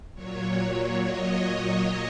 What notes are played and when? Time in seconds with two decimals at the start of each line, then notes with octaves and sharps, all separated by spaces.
0.13 A#2 F#3 C#5
1.04 D#5